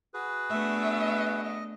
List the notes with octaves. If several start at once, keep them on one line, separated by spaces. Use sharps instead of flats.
F#4 G#4 B4
A3 B3 D4 E5
D#5